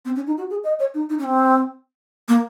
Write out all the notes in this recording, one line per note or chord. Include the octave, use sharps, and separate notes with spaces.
C4
C#4
D#4
F#4
G#4
D#5
C#5
D#4
D#4
C#4
C4
A#3